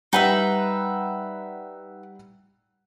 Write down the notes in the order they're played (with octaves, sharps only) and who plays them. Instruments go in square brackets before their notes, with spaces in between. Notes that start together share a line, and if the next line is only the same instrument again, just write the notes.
[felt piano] G3 F#5 G5 [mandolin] D#4 B4 E5